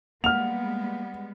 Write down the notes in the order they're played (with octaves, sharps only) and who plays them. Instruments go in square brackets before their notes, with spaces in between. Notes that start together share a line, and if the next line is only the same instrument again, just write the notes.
[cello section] G3 G#3 B3 [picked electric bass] A#3 [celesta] F#5 [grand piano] F6 F7